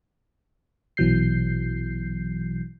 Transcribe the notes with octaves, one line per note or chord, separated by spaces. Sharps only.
A#1 B2 E3 F#3 G6 C7